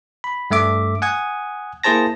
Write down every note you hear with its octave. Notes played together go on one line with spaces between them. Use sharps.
B5
G2 A3 E5 D6
F#5 G#5 D#6 G#6
A#3 E4 G#4 C5 A5 A#6